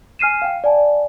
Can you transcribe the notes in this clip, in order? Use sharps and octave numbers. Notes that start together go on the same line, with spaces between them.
G#5 F6 C7 D#7 E7
F5 G5
D5 F#5 G#5 A5